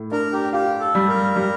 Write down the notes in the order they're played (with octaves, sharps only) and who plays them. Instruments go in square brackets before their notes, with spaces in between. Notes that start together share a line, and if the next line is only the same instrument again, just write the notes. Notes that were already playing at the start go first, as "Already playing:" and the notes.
Already playing: [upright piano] A2
[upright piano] D4 [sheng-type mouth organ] A#4
[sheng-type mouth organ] G4
[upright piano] F4 [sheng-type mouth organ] G4
[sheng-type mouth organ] A4
[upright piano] G3
[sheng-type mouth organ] A#4
[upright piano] G3